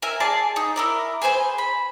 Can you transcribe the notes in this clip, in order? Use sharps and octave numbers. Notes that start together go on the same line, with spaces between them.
A#4 E5 G#5
G#4 D5 A5
D#4
E4 A#4 D5
G#4 B4 C5 G#5
B5